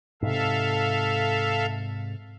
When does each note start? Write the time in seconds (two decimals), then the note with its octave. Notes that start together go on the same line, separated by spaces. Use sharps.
0.22 G#2 C3 A4 E5 F5